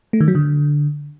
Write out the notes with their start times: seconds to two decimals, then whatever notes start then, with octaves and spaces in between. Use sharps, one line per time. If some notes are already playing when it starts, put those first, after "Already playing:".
0.13 A3
0.21 D#3
0.28 F#3
0.35 D3